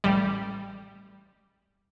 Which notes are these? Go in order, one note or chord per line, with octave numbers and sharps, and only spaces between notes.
A1 G3